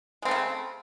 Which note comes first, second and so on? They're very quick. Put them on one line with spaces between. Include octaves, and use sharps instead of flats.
G#3 C4 A3 C#3